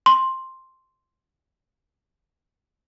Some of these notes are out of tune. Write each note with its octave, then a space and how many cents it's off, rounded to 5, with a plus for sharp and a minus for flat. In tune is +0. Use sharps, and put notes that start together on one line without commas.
C6 +5